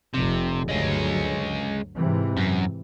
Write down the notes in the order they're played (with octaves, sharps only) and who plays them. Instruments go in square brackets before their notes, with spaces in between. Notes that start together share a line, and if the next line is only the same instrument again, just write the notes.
[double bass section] F1 [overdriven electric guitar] C3
[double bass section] D2 G2 F#3 [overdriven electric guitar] G#3 C#4
[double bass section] G#2 C3 E3
[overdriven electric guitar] F#2